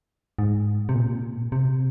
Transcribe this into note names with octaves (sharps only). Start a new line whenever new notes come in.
G#2
C3
A#2
C3